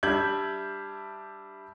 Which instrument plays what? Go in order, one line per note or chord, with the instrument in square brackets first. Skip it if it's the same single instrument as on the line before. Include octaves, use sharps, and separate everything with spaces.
[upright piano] G3 D4 E5 G6 G#6 F#7